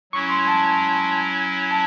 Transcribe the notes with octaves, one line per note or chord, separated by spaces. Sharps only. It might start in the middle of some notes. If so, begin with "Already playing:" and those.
F#3 C#4 E4 C#6
C6
A5
A5